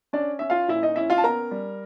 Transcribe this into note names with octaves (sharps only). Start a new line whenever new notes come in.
C#4 D4 D5
C#4 E5
F4 F5
A#2 E4 E5
D#4 D#5
C#4 E4 E5
F4 F5
A5
B3 A#4 A#5
G3